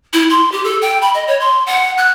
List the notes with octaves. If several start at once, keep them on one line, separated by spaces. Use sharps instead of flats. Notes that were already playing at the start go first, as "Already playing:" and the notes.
E4
C6
G4
A4
G5
B5
D#5
C#5
C6
F#5
F#6